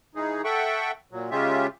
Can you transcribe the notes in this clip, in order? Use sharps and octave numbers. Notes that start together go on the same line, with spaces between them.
E3 G#3 D#4 G#4
A4 E5 F#5 G5 C#6
A#2 F#3
C#3 G#3 C#4 F4 G4 E5